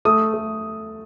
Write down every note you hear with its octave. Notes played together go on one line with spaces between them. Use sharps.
A3 D#6
A3